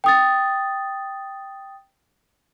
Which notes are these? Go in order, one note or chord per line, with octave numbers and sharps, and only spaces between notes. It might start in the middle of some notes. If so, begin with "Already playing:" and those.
G5 D#6 A6